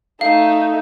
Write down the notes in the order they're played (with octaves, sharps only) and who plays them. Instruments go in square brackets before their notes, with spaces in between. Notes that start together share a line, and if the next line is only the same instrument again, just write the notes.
[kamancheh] A3 D#4 [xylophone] F5